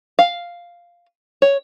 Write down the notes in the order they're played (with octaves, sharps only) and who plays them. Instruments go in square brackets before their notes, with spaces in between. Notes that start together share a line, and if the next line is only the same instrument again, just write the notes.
[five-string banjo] F5
C#5